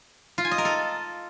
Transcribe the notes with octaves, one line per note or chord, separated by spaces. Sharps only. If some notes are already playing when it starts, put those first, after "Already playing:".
F4
G#5
D#5
A#4
A4